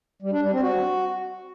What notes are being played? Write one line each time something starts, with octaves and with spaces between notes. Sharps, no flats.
G3
D4
G3
C4
F#4